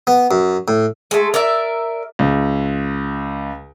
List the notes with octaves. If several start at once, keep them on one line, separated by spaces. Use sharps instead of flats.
B3
F#2
A2
G#3 A3
A#4 D5 E5
C#2